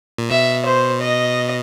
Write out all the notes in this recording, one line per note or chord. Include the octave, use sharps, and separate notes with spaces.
A#2
B2 E5
C5
D#5